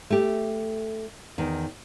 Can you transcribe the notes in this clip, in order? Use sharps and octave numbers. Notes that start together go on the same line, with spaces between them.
A3 G4
E2 D#3